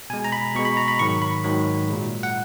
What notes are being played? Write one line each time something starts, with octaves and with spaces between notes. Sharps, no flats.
B2 G#3 G#5
A#5
B5
B2 G#3 C#6
B5
A#5
B5
G#2 D#3 F#3 C#6
B5
G#2 D#3 F#3
A#2 G#3
F#5